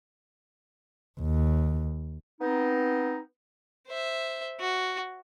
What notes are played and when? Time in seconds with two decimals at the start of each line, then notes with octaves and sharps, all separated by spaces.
1.20 D#2
2.41 B3 C4 D#4
3.87 C5 E5
4.60 F#4